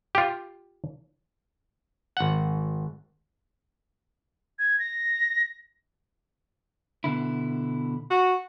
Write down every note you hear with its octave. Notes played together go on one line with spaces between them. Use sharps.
F4 G4
G#1 F#5
G#6
A#6
B2 D3 E4
F#4